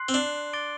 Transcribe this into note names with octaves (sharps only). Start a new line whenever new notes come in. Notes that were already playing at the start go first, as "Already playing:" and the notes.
Already playing: C6 F#6 C7
C4
D4
D6 A6 D7 G7